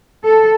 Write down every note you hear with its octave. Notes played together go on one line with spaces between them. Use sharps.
A4